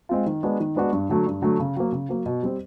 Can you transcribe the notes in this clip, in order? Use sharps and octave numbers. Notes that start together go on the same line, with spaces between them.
G#3 C4 F4
D#3
G#3 B3 D4 F#4
D#3
G#3 B3 D4 F#4
G2
D3 F#3 A3
G2
D3 F#3 A3
C#3
F#3 A#3
C#3
F#3 A#3
B2
G3 C4